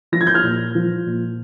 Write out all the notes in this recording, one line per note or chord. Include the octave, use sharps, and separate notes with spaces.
F3 A#6
G#6
G6
F6 G#6
A#2
F3
A#2